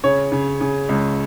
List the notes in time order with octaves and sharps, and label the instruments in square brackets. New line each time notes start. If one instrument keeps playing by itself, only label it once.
[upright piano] C#3 C#5
C#3
C#3
C#2